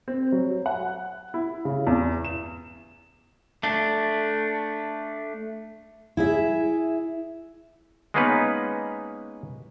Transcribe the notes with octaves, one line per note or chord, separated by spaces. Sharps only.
C4
F#3
F#5
E4
C#3
E2
E7
A3 D4
E4 G#4 E5
G#3 A#3 B3 C#4 D#4 B4